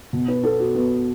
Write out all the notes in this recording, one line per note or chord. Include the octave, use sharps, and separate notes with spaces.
B2
B4
B3 A4
F#4
B3